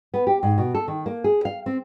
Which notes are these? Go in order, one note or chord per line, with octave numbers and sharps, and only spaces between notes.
B3
G4
G#2
B2
A4
D#3
A#3
G#4
F5
C4